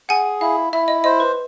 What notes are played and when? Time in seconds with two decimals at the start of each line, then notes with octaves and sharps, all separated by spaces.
0.09 G#4 F#5 G#5
0.41 E4 F5
0.73 E4 E5
0.88 D#5
1.04 C5 D#5
1.20 B4